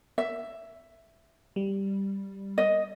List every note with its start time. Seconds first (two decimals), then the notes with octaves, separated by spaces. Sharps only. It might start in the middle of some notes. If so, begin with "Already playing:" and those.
0.18 E5
1.56 G3
2.58 D#5